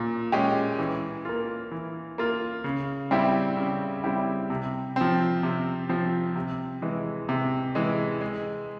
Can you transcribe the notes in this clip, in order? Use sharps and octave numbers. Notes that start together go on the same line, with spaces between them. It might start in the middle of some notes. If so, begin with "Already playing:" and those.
Already playing: A#2
G#3 C#4 G4
E3
A#3 F4
E3
A#3 F4
C#3
G3 C4 E4 G4
C#3
G3 C4 E4 G4
C3
F3 C4
C3
F3 C4
C3
E3 G#3
C3
E3 G#3
G#3